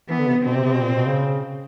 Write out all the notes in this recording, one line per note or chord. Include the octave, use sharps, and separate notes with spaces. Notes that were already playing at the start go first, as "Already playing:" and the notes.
E3 B3
D3
C3
B2 C4
C3
C3
B2
A#2
B2
C#3